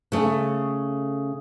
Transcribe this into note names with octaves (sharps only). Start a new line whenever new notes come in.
C#3 A3